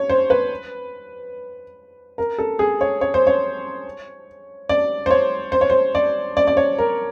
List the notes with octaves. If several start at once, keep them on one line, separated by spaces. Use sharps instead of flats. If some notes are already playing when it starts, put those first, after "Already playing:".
Already playing: C#5
C5
B4
A#4
A4
G#4
C#5
C#5
C5
C#5
D5
C5
C#5
C5
C#5
C5
D5
D5
D5
C#5
A#4